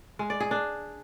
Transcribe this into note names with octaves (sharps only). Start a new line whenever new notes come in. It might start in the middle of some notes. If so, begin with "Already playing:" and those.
G#3
D5
G#4
D4